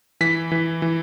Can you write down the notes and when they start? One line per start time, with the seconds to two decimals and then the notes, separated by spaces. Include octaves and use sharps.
0.21 E3 B6
0.52 E3
0.82 E3